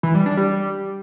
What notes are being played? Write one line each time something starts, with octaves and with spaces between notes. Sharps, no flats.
E3
G3
D4
G3